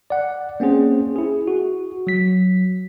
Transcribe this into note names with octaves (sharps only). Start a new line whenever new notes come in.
D5 F#5
A#3 C4 C#4 G#4 C5
E4 G#4
F#4
F#3 B6